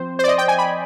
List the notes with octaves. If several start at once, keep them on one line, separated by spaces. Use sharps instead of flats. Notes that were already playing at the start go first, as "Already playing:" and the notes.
Already playing: F3 C4 C5
C5
D5
D#5
G5
G#5
B5